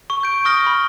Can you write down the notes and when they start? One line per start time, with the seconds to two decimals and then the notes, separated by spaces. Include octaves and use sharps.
0.10 C#6
0.23 G6 D7
0.45 C#6 D#6 F6 A#6 G7
0.67 B5